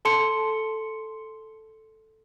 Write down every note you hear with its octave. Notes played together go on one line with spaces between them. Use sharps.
A4 A5 C6 C#7